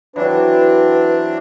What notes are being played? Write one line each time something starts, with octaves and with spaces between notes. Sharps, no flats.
E3 F#3 C4 D4 B4